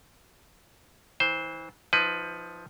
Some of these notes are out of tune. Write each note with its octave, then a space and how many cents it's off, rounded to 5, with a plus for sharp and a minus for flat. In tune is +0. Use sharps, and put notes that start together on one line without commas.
E3 -30 C5 +0
F3 +0 D#4 +30 B4 +15